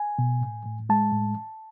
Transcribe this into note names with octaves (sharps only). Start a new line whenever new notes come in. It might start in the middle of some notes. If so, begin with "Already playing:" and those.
Already playing: G#5
B2
A2
A2
G#3 A5
A2